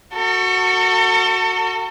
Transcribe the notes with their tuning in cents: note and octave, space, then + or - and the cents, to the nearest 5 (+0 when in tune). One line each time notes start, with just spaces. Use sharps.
F#4 +0 A4 +40